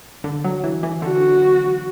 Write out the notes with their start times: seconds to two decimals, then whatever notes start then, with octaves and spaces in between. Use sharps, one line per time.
0.24 D3
0.44 F#3
0.64 E3
0.83 E3
1.02 D3 F#4